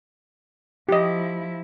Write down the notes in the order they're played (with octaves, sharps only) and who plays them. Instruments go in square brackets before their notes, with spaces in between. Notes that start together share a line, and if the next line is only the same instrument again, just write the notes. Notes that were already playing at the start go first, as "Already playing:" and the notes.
[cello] F3 E4 [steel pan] G4 D#5